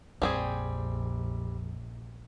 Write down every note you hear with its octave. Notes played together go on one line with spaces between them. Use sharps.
A#1 F2 G3 C4 G#4